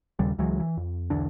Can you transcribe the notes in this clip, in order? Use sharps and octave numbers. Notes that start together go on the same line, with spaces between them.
D#1 D#2 C#3 G3
C#2 E3 F#3 G#3
E3
F2
B1 E2 D3 D4